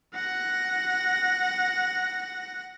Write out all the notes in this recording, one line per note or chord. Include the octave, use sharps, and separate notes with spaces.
F#5 A#6